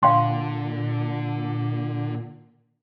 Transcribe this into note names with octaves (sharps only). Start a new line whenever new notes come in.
A#2 D3 F5 G5 C6